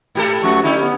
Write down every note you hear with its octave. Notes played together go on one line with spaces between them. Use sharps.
G#2 G4 A4
F2 A3 F#4 C#6
D3 C#4 E4 G4
B3